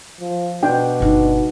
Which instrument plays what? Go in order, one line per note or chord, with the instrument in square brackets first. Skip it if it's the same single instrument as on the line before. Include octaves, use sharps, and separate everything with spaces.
[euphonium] F3
[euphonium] B2 [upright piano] D4 [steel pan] G5
[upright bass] G1 D#4